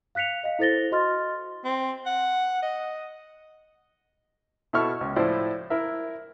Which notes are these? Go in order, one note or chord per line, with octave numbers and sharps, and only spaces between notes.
F5 F#6 B6 C#7 F7
D#5 F5
E4 A4 C5 A6 A#6 G7
F#4 D#5 C6 F6 A6
C4
F#5
D#5
B2 E4 A4 E5 C#6 F6
C#2
A2 F3 E4 C5 D5
E4 A#4 E5